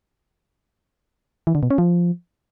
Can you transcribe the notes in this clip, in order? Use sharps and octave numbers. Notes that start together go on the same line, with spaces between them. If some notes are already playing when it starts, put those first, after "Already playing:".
E3
D3
B2
C#4
F3